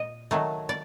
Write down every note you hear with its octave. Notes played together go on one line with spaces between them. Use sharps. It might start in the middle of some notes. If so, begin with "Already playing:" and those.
Already playing: A#2 D#5
D#3 F#3 A3
D5